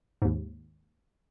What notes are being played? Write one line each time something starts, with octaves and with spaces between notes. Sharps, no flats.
D#2 G#2